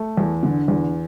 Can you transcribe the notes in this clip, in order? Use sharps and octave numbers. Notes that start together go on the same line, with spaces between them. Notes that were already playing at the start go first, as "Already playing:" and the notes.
Already playing: A3
E2
D3
E2